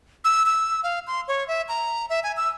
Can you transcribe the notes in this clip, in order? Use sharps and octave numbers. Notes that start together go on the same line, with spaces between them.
E6
E6
F5
C6
C#5
E5
A#5
E5
G#5
E6